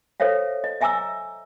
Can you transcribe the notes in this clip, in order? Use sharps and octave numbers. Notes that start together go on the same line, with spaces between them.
A4 C5 C#5 E5 F5
D#5
D#5 E5 G#5 A#5 D6 E6